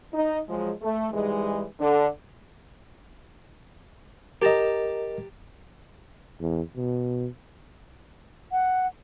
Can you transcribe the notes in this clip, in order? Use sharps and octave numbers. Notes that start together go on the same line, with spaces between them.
D#4
F3 F#3 G#3
A3
G#2 E3 G3 G#3
D3
G4 A#4 D#5 A5 A#5
E2
B2
F#5